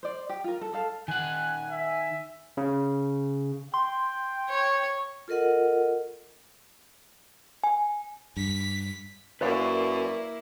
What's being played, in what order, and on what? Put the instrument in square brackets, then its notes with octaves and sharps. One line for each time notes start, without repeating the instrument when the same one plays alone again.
[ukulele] C5 D5
G4
F4 A#4
A4
A4 F5 A5
[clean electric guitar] D#3 F#5 [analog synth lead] G#5 [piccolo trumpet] F#6
[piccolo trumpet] E5
[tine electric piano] C#3
[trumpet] G5 [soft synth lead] C6
[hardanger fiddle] C#5
[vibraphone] F4 A4 A#4 D#5 F#5
[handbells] G#5
[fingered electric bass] G2 [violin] B6
[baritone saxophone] F#2 [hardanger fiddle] A#3 E4 [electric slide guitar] B4 D5 F5